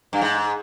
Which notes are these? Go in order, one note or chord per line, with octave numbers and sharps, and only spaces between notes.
G2
G#2